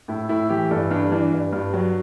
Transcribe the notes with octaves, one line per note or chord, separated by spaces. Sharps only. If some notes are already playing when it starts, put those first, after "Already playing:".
A2 E4
A2 E4
E3 G4
G2 A4
G2 D4
E3 D4
G2
G2
F#3